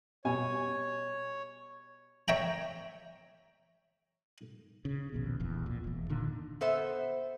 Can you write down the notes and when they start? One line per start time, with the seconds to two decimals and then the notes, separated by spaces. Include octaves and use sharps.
0.25 B2 G3 C#5 G#5
2.28 C#5 E5 G5 A#5
4.85 C#3
5.13 A#1 D#2 B2
5.40 D1 A#1 E2
5.66 A#2
5.84 E1 E2
6.10 A#2 D3 D#3
6.61 B3 A4 C5 E5